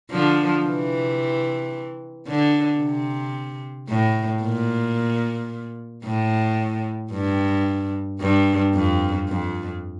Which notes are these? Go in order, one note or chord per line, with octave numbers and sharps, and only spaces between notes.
D3 F3
C3 E3
D3
C3
A2
A#2
A2
G2
G2
F2
F2